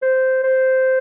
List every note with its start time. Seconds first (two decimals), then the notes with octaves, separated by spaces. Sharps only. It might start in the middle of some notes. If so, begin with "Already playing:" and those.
0.02 C5
0.44 C5